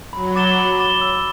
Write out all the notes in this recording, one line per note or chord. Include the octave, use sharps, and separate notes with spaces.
F#3 B5
D6 A6 E7 G7
B5
D6 A6 E7 G7
E6